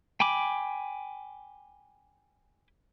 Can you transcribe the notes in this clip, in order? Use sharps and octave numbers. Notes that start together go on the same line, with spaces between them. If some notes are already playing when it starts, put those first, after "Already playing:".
G5 G#5 B5 D6